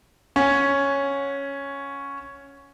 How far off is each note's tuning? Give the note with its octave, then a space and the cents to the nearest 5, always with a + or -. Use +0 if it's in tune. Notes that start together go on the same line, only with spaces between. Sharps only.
C#4 +0 F#5 -20